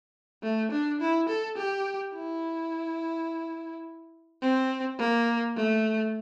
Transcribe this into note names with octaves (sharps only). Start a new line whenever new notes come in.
A3
D4
E4
A4
G4
E4
C4
A#3
A3